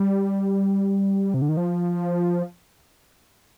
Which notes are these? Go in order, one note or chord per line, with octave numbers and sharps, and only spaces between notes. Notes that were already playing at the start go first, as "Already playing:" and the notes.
Already playing: G3
C3
D3
D#3
F3